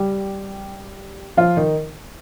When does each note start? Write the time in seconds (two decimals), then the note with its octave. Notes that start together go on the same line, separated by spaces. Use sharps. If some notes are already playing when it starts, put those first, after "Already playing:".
Already playing: G3 G4
1.37 F3 F4
1.57 D#3 D#4